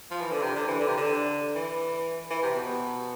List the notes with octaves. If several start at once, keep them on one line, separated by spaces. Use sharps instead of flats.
F3
E3
D3
C3
D3
E3
D3
C3
D3
E3
E3
C3
B2